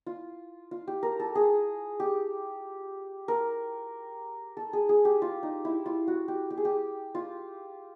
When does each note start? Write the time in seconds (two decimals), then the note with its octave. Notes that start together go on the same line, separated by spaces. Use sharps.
0.06 F4
0.71 F4
0.88 G4
1.03 A#4
1.20 A4
1.35 G#4
2.00 G4
3.28 A#4
4.57 A4
4.73 G#4
4.89 G#4
5.05 G4
5.22 F4
5.43 D#4
5.65 E4
5.86 F4
6.08 F#4
6.28 G4
6.50 G4
6.57 G#4
6.65 G4
7.15 F4